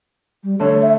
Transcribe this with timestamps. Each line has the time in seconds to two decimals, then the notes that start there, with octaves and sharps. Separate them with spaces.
0.43 G3
0.60 D3 A3 C#5
0.82 E5